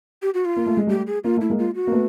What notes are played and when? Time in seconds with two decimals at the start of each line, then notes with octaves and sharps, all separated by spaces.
0.22 G4
0.34 F#4
0.45 F4
0.56 A#3
0.66 A3
0.77 G#3
0.87 G3 A3 G4
1.07 G#4
1.24 A#3 F4
1.37 A3 E4
1.50 G#3 A#3
1.59 F4
1.75 F#4
1.87 A#3
1.92 A3 B3